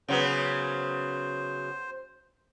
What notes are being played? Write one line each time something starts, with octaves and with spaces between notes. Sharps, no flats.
C#3 F#3 B3 C5